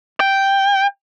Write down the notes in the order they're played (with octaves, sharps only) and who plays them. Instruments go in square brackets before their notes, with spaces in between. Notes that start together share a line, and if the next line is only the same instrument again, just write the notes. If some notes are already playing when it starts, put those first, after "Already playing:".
[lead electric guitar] G5